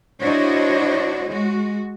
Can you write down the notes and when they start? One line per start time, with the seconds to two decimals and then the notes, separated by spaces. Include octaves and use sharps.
0.20 D4 E4 F#4 C5 C#5 D#5
1.27 G#3 F#4